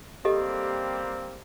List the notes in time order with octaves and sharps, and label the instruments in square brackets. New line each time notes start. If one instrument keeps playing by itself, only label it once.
[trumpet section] G3 A#3 C4 [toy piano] G4 A4 D#5